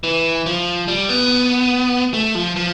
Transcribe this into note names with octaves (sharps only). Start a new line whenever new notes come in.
E3
F3
G3
B3
A3
F3
F3